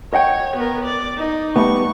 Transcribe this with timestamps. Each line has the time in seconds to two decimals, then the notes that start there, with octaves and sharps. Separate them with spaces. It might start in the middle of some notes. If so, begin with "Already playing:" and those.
0.14 C#5 D#5 F#5 G5
0.56 B3 A#4
0.85 D5
1.17 D#4
1.56 G3 A3 B3 C#6